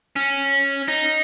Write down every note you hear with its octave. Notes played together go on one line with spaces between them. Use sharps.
C#4
D#4